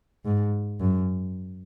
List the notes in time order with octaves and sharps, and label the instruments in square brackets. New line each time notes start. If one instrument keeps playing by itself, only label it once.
[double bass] G#2
F#2